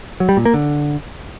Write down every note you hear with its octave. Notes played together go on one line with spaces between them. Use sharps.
F#3
G3
A#2
A#3
D3